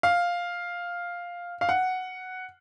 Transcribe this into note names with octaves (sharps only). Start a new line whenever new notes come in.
F5
F5
F#5